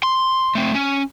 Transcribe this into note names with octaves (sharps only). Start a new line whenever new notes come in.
C6
A3 C4
C#4